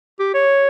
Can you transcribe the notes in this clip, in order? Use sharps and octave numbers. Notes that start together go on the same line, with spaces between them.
G4
C#5